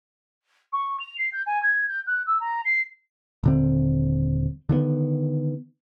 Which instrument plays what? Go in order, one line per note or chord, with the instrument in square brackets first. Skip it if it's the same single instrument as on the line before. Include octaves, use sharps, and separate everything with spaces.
[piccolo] C#6
F7
C7
G6
G#5
G#6
G6
F#6
E6
A#5
C7
[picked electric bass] D#1 D3 C4
D3 D#3 G3 B3